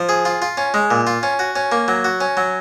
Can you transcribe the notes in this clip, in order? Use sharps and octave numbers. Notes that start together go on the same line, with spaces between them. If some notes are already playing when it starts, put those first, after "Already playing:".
Already playing: F3
G#4
F4
F4
C#4
G#3
A#2
F4
C#4
F#4
C#4
A#3
F#3
F#4
C#4
F#3